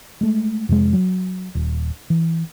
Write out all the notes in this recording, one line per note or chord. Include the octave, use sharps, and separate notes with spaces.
G#3 A3
F2 C3 G#3
F#3
D#1
E3